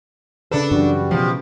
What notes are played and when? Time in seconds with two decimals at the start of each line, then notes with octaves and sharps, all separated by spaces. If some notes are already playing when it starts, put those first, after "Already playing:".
0.51 C#3 D4 A4 B4
0.71 F#2 E3 G3 F#4
1.11 B2 E3 F3 G#3